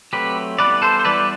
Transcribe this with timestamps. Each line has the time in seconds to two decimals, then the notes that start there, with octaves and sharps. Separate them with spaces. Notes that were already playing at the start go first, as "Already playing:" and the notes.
0.13 F#3 A3 C4 G4 B4
0.59 E3 G3 B3 B4 D5
0.82 A4 C5
1.00 C5
1.05 E3 G3 B3 B4 D5